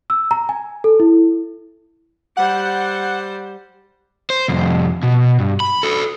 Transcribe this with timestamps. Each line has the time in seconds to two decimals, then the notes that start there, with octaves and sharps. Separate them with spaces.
0.10 E6
0.31 A#5
0.49 G#5
0.84 A4
1.00 E4
2.37 G3 C5 F#5
4.30 C5
4.48 C2 F2
5.03 B2
5.40 G2
5.60 B5
5.83 F#4 A4